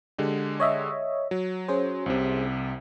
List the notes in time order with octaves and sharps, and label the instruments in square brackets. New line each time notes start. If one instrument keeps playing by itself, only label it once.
[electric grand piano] D3 G#3 G4
[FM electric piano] C#5 D#5 E5
[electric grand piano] F#3
[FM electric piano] C#4 G#4 C5
[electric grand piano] C2 C3